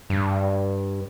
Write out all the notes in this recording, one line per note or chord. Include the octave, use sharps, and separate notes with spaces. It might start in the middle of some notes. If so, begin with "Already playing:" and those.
G2